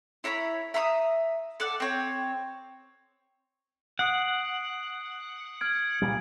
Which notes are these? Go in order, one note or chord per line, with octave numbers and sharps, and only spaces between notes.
E4 C#5 A#5 B5
E5 A#5 C6 D#6
A4 D5 F#5
C4 C#5
F#5 D#6 C7 D7
F6 G#6 D7
A#2 G3